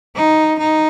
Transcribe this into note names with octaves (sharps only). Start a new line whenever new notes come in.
D#4
D#4